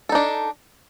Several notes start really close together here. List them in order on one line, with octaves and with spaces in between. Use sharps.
A4 D#4 D4